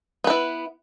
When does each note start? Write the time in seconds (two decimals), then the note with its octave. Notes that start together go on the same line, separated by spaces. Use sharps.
0.24 B3
0.27 B4
0.30 E4